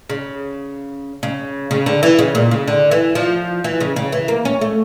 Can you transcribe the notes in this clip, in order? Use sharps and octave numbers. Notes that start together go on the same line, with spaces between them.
C#3
C#3
C#3
D3
E3
C#3
A#2
C#3
D3
E3
F3
E3
C#3
C#3
E3
A#3
C#4
A3